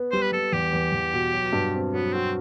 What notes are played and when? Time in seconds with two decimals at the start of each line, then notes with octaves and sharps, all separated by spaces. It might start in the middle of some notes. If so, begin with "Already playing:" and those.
Already playing: B3
0.12 G3 C5
0.22 B4
0.32 G3 A4
0.52 E2 G4
0.73 E2
0.92 E2
1.13 B2
1.34 F#3
1.53 G2
1.74 C4
1.94 F#3 B3
2.13 C4 F#4